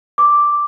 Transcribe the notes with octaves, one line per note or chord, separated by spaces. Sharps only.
D6